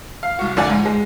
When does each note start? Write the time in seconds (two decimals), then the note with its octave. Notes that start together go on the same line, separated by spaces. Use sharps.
0.23 F5
0.39 C2 F#4
0.56 A#1 D3 F4 D5 F#5 G#5
0.70 G#2
0.85 G#3